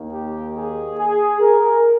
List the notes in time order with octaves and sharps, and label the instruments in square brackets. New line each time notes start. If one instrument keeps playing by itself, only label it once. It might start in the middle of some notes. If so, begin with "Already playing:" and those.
Already playing: [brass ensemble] D#2 D#3 A#3
G4
G#4
G#4
A#4